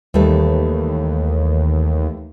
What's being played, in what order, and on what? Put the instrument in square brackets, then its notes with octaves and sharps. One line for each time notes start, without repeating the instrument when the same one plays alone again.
[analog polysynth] D#2 [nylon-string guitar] E3 G3 A3